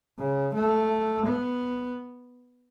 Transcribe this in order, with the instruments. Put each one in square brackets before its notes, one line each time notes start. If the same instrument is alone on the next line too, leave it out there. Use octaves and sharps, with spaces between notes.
[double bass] C#3
A3
B3